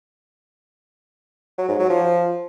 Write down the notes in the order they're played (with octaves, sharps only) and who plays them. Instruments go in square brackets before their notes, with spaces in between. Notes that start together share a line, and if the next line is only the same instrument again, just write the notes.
[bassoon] F#3
G#2
F#3
F3